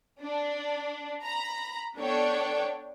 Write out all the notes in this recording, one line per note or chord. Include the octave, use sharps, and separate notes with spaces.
D4
A#5 B5
B3 D4 A4 C#5 G5